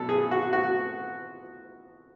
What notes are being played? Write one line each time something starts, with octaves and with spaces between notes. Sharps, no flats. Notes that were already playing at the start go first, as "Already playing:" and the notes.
Already playing: B2 F#3 A4
G#4
F#4
F#4